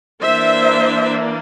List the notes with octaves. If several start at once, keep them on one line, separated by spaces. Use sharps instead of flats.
E3 A#3 D4 C5 E5